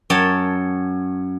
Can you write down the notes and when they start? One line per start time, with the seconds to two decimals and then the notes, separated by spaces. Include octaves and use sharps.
0.10 F#2 C#5 G5 A5